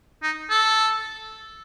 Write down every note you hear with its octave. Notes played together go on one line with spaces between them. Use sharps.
D#4
A4